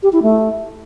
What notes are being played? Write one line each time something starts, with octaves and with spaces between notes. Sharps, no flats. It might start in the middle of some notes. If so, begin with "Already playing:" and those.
G4
E4
A3